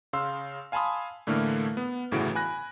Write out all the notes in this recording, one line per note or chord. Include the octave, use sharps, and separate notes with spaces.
C#3 F5 C6 E6
F5 G#5 A5 B5 C6 D#6
A2 D3 E3 A3 A#3 F6
B3
G1 A2 C#3 E3 F#4 D7
G#5 B5 F#6 A#6